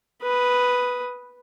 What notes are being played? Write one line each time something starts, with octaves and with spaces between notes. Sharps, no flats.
B4 D#6